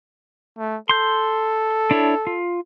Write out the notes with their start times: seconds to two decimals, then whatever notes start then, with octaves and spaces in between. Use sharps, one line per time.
0.58 A3
0.89 A4 C6 G6
1.91 D4 E4 C#5
2.27 F4